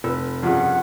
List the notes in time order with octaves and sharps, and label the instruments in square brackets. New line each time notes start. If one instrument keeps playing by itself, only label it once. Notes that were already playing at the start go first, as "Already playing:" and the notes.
[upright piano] F1 [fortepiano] B4 E6
[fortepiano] G2 C#3 [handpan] F3 F4 [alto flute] F#5